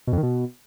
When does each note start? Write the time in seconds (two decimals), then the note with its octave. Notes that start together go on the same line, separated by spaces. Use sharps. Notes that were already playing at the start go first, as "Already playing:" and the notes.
0.07 B2
0.13 F2
0.18 D#3
0.23 B2